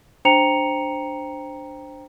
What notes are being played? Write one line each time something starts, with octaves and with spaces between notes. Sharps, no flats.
D4 C5 G5 A#5 C#7 F7